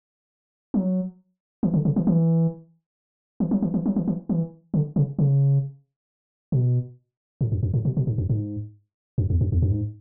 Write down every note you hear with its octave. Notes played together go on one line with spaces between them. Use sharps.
F#3
E3
D3
C#3
E3
E3
E3
F#3
E3
E3
F#3
E3
E3
E3
D3
C#3
C#3
B2
A2
F#2
F#2
A2
B2
B2
G#2
F#2
G#2
F#2
E2
F#2
E2
F#2
G#2